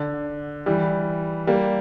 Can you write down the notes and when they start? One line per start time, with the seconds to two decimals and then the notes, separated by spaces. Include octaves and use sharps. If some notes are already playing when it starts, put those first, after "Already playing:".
Already playing: D3
0.66 E3 G3
1.47 G3 A#3